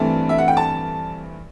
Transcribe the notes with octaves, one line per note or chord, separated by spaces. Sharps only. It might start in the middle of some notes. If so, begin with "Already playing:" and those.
Already playing: G2 E3 A3 C4 A5
E5
F#5
G5
A5